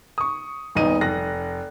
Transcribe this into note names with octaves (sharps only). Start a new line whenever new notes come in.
C#6 D#6
D#1 G#1 B3 D#4 D#7
F1 F#6 A#6